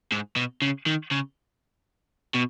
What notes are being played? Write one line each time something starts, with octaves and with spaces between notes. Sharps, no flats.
G#2
B2
C#3
D#3
C#3
B2